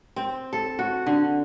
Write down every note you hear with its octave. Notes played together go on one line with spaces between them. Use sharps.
C4
A4
F#4
D3